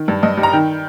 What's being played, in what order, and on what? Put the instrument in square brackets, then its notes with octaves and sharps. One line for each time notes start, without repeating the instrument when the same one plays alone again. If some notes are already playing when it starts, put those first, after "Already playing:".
Already playing: [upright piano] D#3
G2
G2 D#5
G3
A#5
D#3 G5